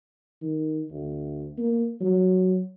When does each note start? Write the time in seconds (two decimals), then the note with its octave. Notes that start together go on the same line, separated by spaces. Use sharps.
0.42 D#3
0.91 D2
1.58 A#3
2.01 F#3